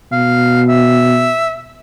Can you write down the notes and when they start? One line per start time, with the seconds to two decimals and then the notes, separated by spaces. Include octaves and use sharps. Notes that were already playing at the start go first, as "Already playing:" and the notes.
0.12 B2 F5
0.69 E5